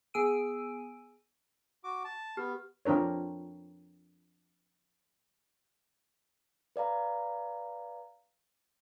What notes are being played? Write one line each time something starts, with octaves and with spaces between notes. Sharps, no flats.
B3 G#4 G#5 E6 D7 D#7
F#4 D6
A5
B3 G4 F6
F3 C4 D4 A#4 C#5
B4 D5 F5 A#5